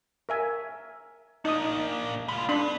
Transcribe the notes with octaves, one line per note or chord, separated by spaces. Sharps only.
A#4 E5 G#5
A#3 D4 D#4 D#6
G#3 F4 B5
B3 D4 B5 C6